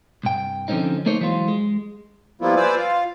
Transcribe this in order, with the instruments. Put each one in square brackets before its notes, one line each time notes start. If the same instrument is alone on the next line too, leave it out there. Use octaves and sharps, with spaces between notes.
[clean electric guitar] C2 G2 G5
D3 F3 G#3 C4 C#4 D#4
A3 A#3 D#4 C5 C#5
E3 F#3 G#3 F4 C5
G#3
[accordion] F3 G3 A#3 B3 E4 F4
B4 C5 D5 G#5 D6 E6
F4 F5